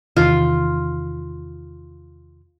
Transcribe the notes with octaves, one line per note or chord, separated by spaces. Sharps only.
E2 C3 D#3 F4